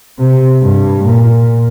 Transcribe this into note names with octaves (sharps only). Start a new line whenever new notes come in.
C3
G2
A#2